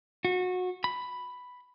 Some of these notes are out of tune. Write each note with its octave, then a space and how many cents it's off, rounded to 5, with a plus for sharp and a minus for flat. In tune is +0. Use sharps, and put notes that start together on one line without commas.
F#4 -25
B5 +5